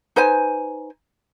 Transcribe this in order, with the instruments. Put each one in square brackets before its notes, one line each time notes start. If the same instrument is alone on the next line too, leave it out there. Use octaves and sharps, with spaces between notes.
[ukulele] D#4 B4 C5 G#5